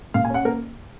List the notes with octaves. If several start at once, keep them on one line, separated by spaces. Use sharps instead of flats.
A#2 F5
G#5
C#4 F#5
A#3 A#4